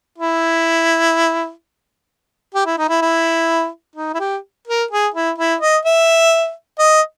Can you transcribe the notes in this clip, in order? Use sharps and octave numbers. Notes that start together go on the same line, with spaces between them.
E4
G4
E4
D#4
E4
E4
D#4
E4
G4
A#4
G#4
E4
E4
D#5
E5
D#5